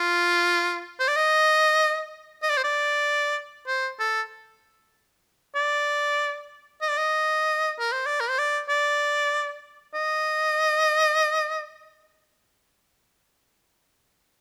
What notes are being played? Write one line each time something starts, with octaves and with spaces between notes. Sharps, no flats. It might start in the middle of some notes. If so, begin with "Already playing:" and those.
Already playing: F4
C5
D5
D#5
D#5
D5
C5
D5
C5
A4
D5
D#5
D5
D#5
A#4
C5
D5
A#4
C5
D5
D5
D#5